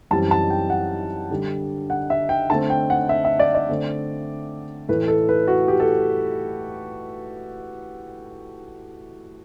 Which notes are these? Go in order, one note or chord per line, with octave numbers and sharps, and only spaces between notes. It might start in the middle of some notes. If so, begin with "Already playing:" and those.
F#2 E3 G3 C4 A5
A5
G5
F#5
D3 G3 D4
F#5
E5
G5
D3 A3 C4 A5
G5
F#5
E5
E5
D5
D5
D3 A3 C4
A2 E3 A3 B4
A4
B4
F#4
G4
A4